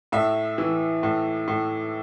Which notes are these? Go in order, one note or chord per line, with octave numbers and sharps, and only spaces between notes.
A2 E5
E3
A2
A2